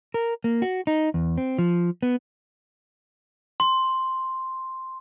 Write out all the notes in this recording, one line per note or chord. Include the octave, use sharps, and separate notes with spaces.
A#4
A#3
F#4
D#4
E2
C4
F3
B3
C6